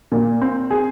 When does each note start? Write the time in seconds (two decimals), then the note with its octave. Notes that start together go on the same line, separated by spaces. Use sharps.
0.12 A#2
0.41 C4
0.71 G#4